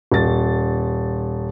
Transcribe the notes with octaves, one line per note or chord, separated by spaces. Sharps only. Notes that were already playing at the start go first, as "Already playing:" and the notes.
D#1 A6